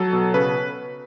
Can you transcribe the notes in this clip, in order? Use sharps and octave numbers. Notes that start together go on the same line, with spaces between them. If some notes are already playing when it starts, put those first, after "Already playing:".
Already playing: F#3 A4
B2
C#3 B4